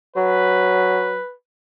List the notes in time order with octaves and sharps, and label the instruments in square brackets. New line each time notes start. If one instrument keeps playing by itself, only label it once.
[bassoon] F#3 [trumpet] B4